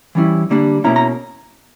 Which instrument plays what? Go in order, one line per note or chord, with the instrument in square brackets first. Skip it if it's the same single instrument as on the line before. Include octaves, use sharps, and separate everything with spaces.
[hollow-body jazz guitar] E3 G3 C#4 E4
D3 G3 A#3 D4
B2 A#3 C#4 E4 A#5
A#5